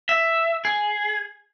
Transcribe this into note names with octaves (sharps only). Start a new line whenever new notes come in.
E5
G#4